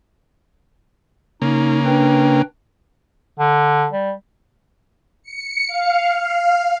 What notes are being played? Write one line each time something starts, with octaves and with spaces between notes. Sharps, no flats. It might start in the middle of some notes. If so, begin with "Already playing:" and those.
C#3 A#3 D#4
D4 B4 G5
D3
G3
C#7
F5
F5